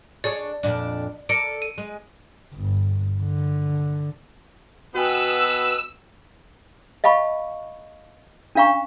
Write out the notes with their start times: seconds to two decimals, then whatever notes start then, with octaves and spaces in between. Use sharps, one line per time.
0.24 D4 G#4 C#5 D5
0.63 F2 A#2 D4
1.29 A4 A#4 D5 C#7 D7
1.62 D#7
1.78 G#3
2.54 G1
3.22 D3
4.95 B2 B3 F#4 B4 G5 G#5 E6
7.04 D#5 F5 A5 B5 C#6
8.55 C#4 D4 F5 A#5 C#6